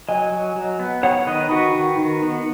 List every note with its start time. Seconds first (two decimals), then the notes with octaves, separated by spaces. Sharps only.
0.09 F#3 D#5 G#5
0.32 F#3
0.56 F#3
0.79 B3
1.03 B3 C#5 F#5
1.27 D#3 B4 D#5
1.51 D#3 F#4 B4
1.75 D#3
1.98 D#3
2.22 B3